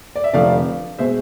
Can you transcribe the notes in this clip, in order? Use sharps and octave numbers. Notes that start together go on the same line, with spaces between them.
D5
E5
F1 F2 D3 F3 A3 D5 F5
B2 G#3 C5 E5